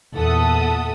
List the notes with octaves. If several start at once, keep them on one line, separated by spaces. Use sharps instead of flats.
E2 A#2 A4 E5 F#5 D#6